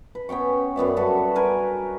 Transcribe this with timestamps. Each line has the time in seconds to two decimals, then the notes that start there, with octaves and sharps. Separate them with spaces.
0.15 B4
0.29 B3 C#4 G5 C#6
0.76 F#2 B3 D5 E5
0.97 G2 F#4 A4 B4
1.35 A#4 B4 G#5